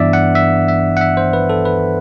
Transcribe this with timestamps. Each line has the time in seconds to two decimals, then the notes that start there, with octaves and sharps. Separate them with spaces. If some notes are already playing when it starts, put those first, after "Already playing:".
Already playing: G2 E3 B3 D4 D5 E5
0.13 F#5
0.35 E5
0.68 E5
0.97 F#5
1.01 E5
1.17 C5
1.33 B4
1.50 A4
1.65 B4